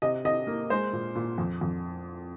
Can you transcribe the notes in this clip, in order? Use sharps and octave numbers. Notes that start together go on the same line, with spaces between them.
C3 D#5
C3 D#5
A#3
G#3 C5
A#2
A#2
F2
F2